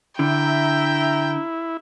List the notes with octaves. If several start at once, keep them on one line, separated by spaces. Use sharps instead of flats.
D3 E4 E5 G5 A#5